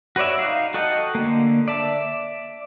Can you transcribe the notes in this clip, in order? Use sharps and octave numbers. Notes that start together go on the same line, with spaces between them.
F#4 B4 C#5 D5 E5
D#4 F5
F#4 A4 D#5 F#5 G5
D3 A#3
D5 E5 A5